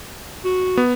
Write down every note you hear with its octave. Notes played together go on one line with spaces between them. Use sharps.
F#4
B3